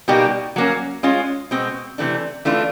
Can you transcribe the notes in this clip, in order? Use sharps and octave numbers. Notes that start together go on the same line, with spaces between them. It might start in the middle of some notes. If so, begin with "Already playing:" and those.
B2 G3 A#3 D#4 G4
F#3 A#3 C#4
G#3 C#4 F4
B2 G#3 C4
C3 E3 A3 D4
E3 A3 D4 F4